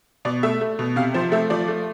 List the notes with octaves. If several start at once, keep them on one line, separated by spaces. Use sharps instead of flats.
B2 D5
A3 E5
A3
B2
C3 F5
F3 C5
A3 E5
F3 D5
A3